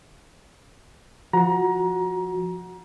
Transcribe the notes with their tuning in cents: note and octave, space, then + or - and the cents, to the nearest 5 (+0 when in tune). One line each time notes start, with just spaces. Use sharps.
F3 +0 F#4 -10 A#5 +25